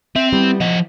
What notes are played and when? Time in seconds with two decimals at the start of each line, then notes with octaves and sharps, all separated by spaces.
0.16 C4 E5
0.33 G3 B3 E4
0.60 F3 D#5 F#5